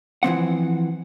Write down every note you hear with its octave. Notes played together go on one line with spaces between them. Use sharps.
E3 F3 C4 F#5